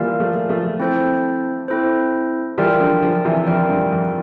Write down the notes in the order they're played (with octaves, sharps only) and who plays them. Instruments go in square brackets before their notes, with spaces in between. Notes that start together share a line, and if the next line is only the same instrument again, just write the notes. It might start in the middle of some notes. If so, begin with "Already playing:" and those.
Already playing: [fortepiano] E3 G3 [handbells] A#3 F4 A#4 D5 F5
[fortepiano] F3 A3
F3 A3
[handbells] C4 E4 A4 C5
C4 E4 A4 C5
[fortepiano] E3 G3 [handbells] F4 A#4 D5 G5
[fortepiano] D3 F3
D3 F3
C3 E3
[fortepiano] F2 [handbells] F4 A#4 D5 G5
[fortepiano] G2
F2